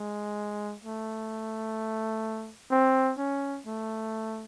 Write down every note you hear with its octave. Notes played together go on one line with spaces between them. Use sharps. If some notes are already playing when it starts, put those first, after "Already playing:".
Already playing: G#3
A3
C4
C#4
A3